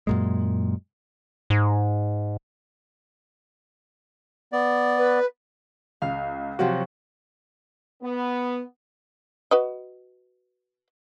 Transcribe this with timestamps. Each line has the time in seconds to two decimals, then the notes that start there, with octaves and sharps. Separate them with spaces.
0.07 F#2 A#2 G#3
1.50 G#2
4.52 B3 D5
4.98 B4
6.02 C#2 F5
6.59 C3 F3 F#3 F#4
8.02 B3
9.51 F#4 B4 D#5